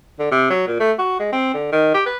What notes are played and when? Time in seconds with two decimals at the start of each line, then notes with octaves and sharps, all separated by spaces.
0.19 D3
0.31 C3
0.50 F#3
0.67 A#2
0.80 A3
0.99 F#4
1.19 G#3
1.32 C4
1.54 D3
1.72 D#3
1.94 G4
2.06 B4